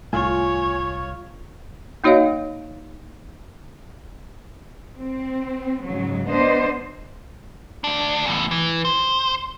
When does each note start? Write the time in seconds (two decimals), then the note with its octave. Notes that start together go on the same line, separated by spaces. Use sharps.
0.13 C2 A2 F4 C#5 G#5
2.04 A#3 D#4 F#4 C#5 D#5 F5
4.97 C4
5.84 G#2 C#3 F#3
6.28 B3 D4 C5 D#5
7.84 D2 D4
8.26 E2 A2
8.51 E3
8.85 C5